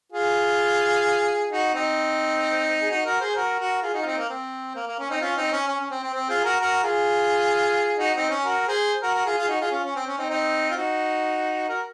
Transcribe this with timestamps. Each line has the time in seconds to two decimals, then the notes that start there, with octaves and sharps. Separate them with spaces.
0.12 F4 G#4
1.51 D#4 F#4
1.74 C4 D#4
2.81 G#4
2.90 D#4 F#4
3.05 F#4 A#4
3.20 G#4 C5
3.36 F#4 A#4
3.59 F#4 A#4
3.82 F4 G#4
3.94 D#4 F#4
4.02 F4
4.05 C4 D#4
4.17 A#3
4.29 C4
4.75 A#3
4.87 A#3
4.99 C#4
5.10 C4 D#4
5.21 C#4 F4
5.36 C4 D#4
5.52 C#4
5.67 C#4
5.80 C#4
5.91 C4
6.03 C4
6.14 C4
6.29 F4 G#4
6.44 F#4 A#4
6.60 F#4 A#4
6.83 F4 G#4
7.98 D#4 F#4
8.14 C4 D#4
8.30 C#4
8.45 F#4 A#4
8.68 G#4 C5
9.02 F#4 A#4
9.14 F#4 A#4
9.26 F4 G#4
9.38 F4 G#4
9.48 D#4 F#4
9.60 F4 G#4
9.72 C#4 F4
9.84 C#4
9.96 C4
10.07 C#4
10.18 C4 D#4
10.30 C4 D#4
10.70 F4
10.76 D#4 F#4
11.68 F#4 A#4